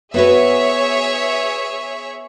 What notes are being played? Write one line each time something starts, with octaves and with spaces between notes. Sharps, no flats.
B3 F#4 G#4 B4 C#5 E5